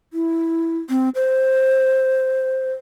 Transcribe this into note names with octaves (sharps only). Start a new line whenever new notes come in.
E4
C4
C5